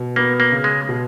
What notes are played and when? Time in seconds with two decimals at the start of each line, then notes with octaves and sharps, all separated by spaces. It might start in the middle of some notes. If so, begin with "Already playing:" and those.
Already playing: B2
0.16 A#3 B3
0.40 A#3
0.52 C#3
0.64 G#3
0.89 B2